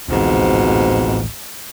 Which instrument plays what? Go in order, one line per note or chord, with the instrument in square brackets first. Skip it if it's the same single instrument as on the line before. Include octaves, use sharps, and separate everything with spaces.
[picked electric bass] D1 A1 [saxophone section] F2 G#2 B2